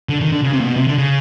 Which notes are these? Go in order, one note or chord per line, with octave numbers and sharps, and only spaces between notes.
D3
D#3
D3
C#3
C3
A#2
B2
C3
D3
C#3